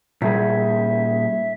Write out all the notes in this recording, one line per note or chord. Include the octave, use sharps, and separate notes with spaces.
A#2 G3 G#4 E5